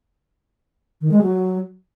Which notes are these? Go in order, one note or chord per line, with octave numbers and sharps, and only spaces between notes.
D#3
G#3
F#3